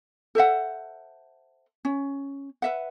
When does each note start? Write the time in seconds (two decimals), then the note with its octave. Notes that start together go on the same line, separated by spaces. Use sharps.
0.35 A4 C5 E5 F#5
1.85 C#4
2.62 B4 E5 F#5